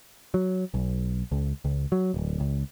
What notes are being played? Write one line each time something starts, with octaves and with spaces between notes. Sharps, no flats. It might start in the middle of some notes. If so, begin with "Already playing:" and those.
F#3
B1
C#2
C#2
F#3
D1
C#2